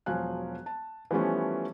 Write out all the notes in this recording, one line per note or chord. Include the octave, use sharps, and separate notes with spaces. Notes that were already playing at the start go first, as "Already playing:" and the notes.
E1 F3 F#3 F5 G#5 F#6
A5
E3 F3 G3 A3 B3 C#4